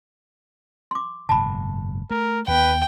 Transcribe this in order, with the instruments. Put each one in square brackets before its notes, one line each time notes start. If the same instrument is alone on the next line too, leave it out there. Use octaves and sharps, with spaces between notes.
[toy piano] C6 D6
[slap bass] F#1 G#2 B2 [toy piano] A5 B5
[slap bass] A3 [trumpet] A#4
[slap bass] D#2 B3 [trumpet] B4 [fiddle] G5